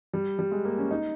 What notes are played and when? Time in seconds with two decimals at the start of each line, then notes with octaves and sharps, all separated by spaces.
0.13 G3
0.39 G3
0.51 G#3
0.65 A#3
0.78 C#4
0.91 D#4